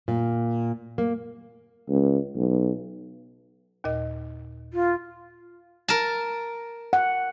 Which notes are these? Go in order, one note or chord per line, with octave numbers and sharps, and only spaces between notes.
A#2
A#3
C#2
B1
D#2 A#2 D#5
F4
A#4 A5
F#5